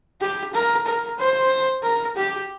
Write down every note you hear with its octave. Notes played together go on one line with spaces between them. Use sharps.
G4
A#4
A#4
C5
A#4
G4